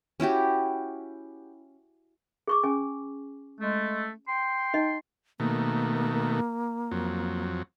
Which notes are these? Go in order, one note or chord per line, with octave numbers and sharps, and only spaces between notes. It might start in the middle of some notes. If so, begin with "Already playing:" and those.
C#4 E4 F#4 G4
G#4 C#6 D6
C#4 G#4 G#5
G#3 A3
G5 C6
D#4 D#5
B2 D#3 A3 A#3
F2 F#3